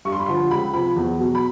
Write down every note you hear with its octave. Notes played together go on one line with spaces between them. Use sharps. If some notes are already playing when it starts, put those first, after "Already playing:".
G2 C#6
C6
B5
D3 F3 C6
C#2 B5
C3 F3 B5
E2
B2 F#3
B5